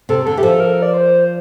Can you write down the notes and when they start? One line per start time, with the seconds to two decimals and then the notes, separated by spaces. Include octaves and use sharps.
0.09 C3 A4
0.25 D3 A4
0.37 E3 G4
0.43 F3 A4
0.60 A#4
0.82 D5
0.94 C5